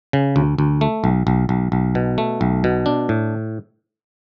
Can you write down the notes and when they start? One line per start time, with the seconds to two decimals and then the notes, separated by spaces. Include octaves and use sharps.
0.13 C#3
0.36 D2
0.58 D2
0.81 A3
1.04 B1
1.27 B1
1.49 B1
1.72 B1
1.95 B2
2.18 A3
2.41 B1
2.64 B2
2.86 D4
3.09 A2